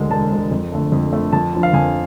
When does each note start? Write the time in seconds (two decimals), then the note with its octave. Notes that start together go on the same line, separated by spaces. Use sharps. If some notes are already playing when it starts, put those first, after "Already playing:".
Already playing: E1 D2 D3 G#3
0.10 E1 A5
0.31 D2 D3 G#3
0.51 F2
0.72 D3 A3
0.92 F2
1.13 D3 A3
1.33 F2 A5
1.53 D3 F3
1.63 F5
1.73 F2 G#5